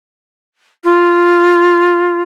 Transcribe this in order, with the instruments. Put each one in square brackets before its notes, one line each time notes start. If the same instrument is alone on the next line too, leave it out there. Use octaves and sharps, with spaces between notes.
[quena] F4